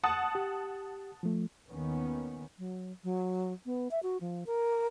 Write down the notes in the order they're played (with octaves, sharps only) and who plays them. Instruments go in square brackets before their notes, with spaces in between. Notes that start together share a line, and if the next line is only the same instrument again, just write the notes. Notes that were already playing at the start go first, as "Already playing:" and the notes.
[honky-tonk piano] F#5 A5 D#6
[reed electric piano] G4
F3 A3
[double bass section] D#2 D#3 B3 C#4
[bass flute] F#3
F#3
B3
E5
F#4
F3
A#4